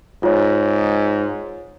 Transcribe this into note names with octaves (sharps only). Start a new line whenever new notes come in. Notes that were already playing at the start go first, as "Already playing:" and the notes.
G#2 F4 C#5